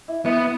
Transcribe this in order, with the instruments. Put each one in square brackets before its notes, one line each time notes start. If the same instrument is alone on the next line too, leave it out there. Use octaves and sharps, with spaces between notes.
[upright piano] E4
[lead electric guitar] B3 [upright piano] E4